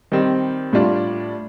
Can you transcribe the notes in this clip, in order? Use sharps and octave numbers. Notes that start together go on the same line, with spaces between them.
D#3 G3 C4
A2 G3 D4 F4